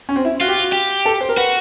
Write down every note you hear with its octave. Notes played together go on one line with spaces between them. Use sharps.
C#4
C4
E4
F4 F#4
G4
F#4
G4
A4
C5
A#4
F#4 B4